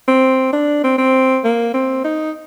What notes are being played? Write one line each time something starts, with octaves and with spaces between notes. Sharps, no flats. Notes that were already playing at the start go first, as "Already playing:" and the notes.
C4
D4
C4
C4
A#3
C4
D#4